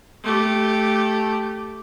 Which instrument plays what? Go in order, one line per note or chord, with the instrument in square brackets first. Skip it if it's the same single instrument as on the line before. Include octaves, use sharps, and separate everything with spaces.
[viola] A3 G4